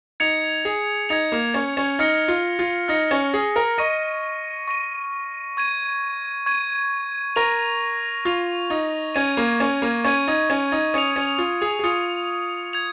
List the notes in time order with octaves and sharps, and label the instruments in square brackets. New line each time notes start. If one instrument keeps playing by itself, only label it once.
[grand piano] D#4 [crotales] G#6 C#7 F7
[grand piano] G#4
[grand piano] D#4 [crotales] G#6 C#7 F7
[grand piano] A#3
C#4
C#4
[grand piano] D#4 [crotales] F6 A#6 C#7
[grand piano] F4
F4
[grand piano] D#4 [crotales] F6 A#6 C#7
[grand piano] C#4
G#4
A#4
[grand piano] D#5 [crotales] C#6 A#6 D#7
[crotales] C#6 A#6 D#7
C#6 G#6 D#7
C#6 G#6 D#7
[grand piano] A#4 [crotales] C#6 A#6 F7
[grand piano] F4 [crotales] C#6 A#6 F7
[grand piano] D#4
[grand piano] C#4 [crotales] C#6 G#6 D#7
[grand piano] A#3
C#4
A#3
[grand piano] C#4 [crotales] C#6 G#6 D#7
[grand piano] D#4
C#4
D#4
[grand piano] C#4 [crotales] D#6 C#7 F7
[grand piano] C#4
F4
G#4
G#4
[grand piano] F4 [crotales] D#6 C#7 F7
[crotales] G#6 F7